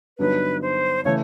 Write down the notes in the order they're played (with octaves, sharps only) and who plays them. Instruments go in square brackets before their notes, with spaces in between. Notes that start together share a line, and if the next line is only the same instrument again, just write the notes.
[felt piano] G2 D3 F#3 B3 D#4 [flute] B4
[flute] C5
[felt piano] C#3 E3 A3 [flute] C#5